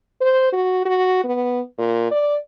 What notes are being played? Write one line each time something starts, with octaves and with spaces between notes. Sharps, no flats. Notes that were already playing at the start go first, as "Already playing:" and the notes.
C5
F#4
F#4
B3
A#2
D5